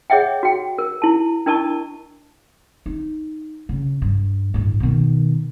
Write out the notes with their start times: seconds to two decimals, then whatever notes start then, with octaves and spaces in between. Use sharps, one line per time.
0.10 G#4 C#5 D#5 E5 F#5 G5
0.43 F#4 G5
0.78 A#4
1.02 E4 A5
1.46 D4 E4 A#4 D#5 A5 C#6
2.86 D#4
3.69 C#3
4.02 G2
4.54 A1 G2
4.80 B2 D#3